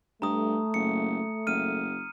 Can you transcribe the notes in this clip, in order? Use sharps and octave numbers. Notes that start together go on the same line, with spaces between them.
G2 A3 A#5 D#6
F#1 C#7
F#1 F6 D#7